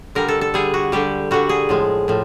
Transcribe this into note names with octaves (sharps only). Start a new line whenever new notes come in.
D3 G3 A#4
A4
A4
D3 G3 G#4
F#4
D3 G3 G4
D3 G3 F#4
G#4
A2 F3 G#3
A2 F3